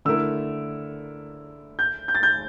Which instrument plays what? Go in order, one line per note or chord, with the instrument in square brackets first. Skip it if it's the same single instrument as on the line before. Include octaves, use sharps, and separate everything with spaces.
[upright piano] D3 A3 E4 A#4 [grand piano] E6
[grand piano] G6
G6
A6
G6